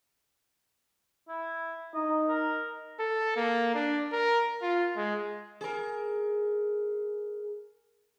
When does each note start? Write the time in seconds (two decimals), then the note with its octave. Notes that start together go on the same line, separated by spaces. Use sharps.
1.28 E4
1.94 D#4 D#5
2.28 A#4
2.99 A4
3.36 A#3
3.74 D4
4.12 A#4
4.62 F4
4.96 G#3
5.61 G#4 A#4